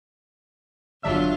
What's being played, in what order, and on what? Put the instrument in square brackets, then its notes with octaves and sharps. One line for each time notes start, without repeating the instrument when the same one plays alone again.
[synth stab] G1 D4 E5 [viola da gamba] E2 F#3 F4